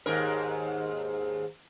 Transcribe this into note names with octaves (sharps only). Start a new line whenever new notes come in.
D#2 G#2 A#4